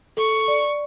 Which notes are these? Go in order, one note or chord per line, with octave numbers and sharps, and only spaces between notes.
A4 C#6
D5